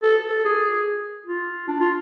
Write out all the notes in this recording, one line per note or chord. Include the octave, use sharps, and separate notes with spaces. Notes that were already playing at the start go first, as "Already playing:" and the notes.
A4
A4
G#4
F4
D4
F4